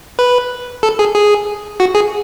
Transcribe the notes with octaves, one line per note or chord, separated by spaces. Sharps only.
B4
A4
G#4
G#4
F#4
G#4